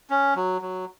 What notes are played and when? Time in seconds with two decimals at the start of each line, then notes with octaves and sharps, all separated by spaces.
0.10 C#4
0.36 F#3
0.62 F#3